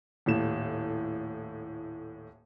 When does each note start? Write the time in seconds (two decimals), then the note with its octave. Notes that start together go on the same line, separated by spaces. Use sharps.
0.26 D#1 A2 E7